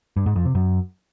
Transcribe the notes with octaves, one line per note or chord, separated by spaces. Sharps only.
G2
G#2
F2
C3
F#2